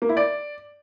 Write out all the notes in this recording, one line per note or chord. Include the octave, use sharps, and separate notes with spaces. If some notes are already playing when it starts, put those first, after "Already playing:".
A#3
E4
D5